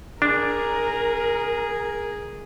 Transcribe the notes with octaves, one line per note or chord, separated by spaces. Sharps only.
D4 G#4 A#4